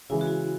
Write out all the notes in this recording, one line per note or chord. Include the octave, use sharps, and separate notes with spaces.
C#3 E3 G#3 E4
F#4
E4